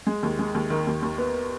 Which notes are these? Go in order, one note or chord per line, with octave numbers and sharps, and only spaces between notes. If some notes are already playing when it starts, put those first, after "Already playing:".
G#3
D#2
G#3
D#2
D#3
D#2
D#2
B3